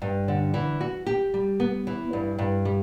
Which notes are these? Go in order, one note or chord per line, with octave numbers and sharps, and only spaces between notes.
G2
D3
E3
F#4
G4
G3
B3
E3
G2
G2
G3